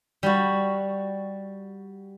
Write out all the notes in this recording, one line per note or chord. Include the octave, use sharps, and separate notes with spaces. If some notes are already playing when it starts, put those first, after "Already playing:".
G3 F#4